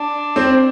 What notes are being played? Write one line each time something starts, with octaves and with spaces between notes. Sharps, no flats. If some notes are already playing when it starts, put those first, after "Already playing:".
Already playing: D4
C4